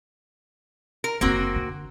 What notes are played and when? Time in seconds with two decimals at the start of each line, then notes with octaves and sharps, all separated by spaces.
1.04 A#4
1.21 F#1 D3 A#3 C4 F#4
1.56 D3